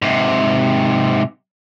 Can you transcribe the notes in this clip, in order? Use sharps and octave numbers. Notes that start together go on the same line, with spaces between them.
G#2 C3